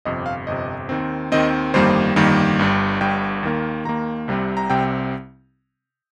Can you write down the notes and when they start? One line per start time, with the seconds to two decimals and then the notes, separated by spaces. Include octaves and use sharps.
0.05 G1 F2 C3 D#5
0.26 F5
0.47 G1 F2 C3 D#5
0.89 D#2 D#3 C4
1.32 D#2 D#3 C4 D#5
1.74 G1 F2 D#3 G3 A#3 C5
2.16 G1 F2 D#3 G3 A#3
2.59 G1 G2 G3
3.01 G1 G2 G3 G5
3.43 D#2 D#3 A#3
3.85 D#2 D#3 A#3 A#5
4.28 C2 C3 G3 C4
4.57 A#5
4.70 C2 C3 G3 C4 G5